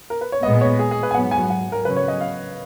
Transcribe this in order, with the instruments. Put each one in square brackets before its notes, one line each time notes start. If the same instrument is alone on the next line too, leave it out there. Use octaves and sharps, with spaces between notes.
[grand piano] A#4
B4
C#5
[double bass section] A#2 G#3 B3 [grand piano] D#5
[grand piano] C#5
G#4
G#4
B4
G#5
[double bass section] G#2 F#3 B3 [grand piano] F#5
[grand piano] G#5
F#5
A#4
[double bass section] C#3 F#3 C#4 [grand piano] B4
[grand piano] C#5
D#5
F5